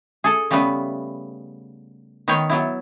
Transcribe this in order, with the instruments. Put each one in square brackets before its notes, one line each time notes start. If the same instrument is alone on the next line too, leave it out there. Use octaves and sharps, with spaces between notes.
[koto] G#4 A4
C#3 G3 A3 B3 B4
D#3 B3 B4 C#5 G5
F#3 B3 E4